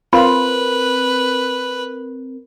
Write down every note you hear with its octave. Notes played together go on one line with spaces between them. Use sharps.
C4 F4 A#4 B4 B5